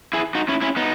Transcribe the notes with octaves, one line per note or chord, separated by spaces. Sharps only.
E4 G#4
D#4 F#4
C#4 E4
C#4 E4
B3 D#4